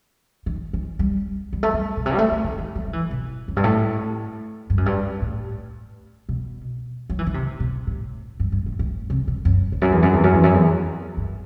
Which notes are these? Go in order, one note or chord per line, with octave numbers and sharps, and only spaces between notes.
D#3
D#3
G3
G3
A3
G3
B2
C3
G3
A3
A3
D#3
D#3
F#3
F#3
E3
B2
F#2
G2
A2
G2
F#2
G2
A2
B2
F#3
E3
D#3
C3
B2
A2
G2
G2
A2
A2
C3
B2
F#2
E2
F#2
E2
F#2
E2
F#2
E2
F#2
E2
G2